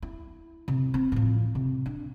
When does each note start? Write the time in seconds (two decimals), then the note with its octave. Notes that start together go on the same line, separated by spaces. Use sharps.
0.02 E4
0.68 C3
0.94 C4
1.12 A2 F3
1.55 C3
1.86 D4